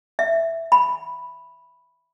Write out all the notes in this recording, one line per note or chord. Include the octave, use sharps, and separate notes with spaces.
E5
B5